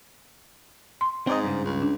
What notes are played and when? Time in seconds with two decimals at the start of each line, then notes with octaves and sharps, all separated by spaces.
1.01 C6
1.27 G#2 C4 D5 D#5
1.44 G2 C#3
1.65 C#2
1.82 D4